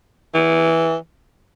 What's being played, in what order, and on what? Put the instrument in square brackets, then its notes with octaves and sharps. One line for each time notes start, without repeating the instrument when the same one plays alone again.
[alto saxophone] E3